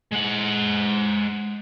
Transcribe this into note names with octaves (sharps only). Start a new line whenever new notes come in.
G#3 F#5